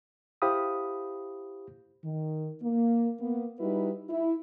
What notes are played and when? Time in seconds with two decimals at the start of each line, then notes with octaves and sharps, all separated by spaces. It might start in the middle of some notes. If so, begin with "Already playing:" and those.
0.42 E4 G4 C5 F5 B5 D#6
2.05 D#3
2.62 A#3
3.20 A#3 B3
3.60 G3 D#4 E4 F#4 B4
4.09 E4